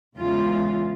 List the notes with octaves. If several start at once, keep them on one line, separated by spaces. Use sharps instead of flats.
E2 C#3 E3 G#3 F4